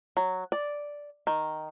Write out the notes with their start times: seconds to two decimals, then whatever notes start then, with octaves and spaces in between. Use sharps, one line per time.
0.17 F#3
0.52 D5
1.27 D#3